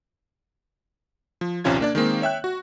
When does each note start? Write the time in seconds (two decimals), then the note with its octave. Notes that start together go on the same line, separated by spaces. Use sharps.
1.41 F3
1.64 A#1 D#2 C3 C#4 F4 G#6
1.81 A#3 D4 D5
1.95 D#3 G#3 A#3 C4
2.22 C#5 E5 G5 F#6
2.44 F#4